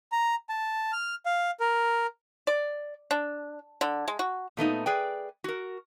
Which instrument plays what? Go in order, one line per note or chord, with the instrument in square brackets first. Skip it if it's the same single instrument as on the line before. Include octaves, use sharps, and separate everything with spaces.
[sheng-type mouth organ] A#5
A5
F6
F5
A#4
[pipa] D5
D4
D3
G#3
F#4
[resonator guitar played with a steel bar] A#2 A3 B3 D#4
G#4 B4 D5 G5
F#4 A#4